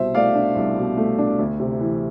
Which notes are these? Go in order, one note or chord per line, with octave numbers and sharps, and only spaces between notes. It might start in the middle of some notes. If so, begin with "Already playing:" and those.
Already playing: C2 B2 C5 E5
A3 D5 F5
D4
C2
B2
A3
D4
D2
C3
E3